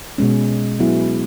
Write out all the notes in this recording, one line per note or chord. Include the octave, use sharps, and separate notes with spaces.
B2 G#3 C#4
F#3 B3 E4 G#4